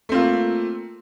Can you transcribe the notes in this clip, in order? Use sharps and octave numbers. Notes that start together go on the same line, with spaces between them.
A3 A#3 C4 F4